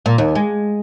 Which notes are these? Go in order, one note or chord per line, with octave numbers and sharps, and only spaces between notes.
A#2
D#2
G#3